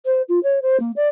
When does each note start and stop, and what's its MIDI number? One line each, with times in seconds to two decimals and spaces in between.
0.05 0.21 72
0.28 0.39 65
0.43 0.59 73
0.62 0.79 72
0.80 0.92 58
0.96 1.08 74